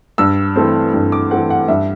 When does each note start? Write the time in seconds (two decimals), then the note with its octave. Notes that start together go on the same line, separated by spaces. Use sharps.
0.18 G2 E6
0.56 E3 A3 C4
0.94 G2
1.12 D6
1.31 E3 A3 C4 F#5
1.50 F#5
1.68 G2 E5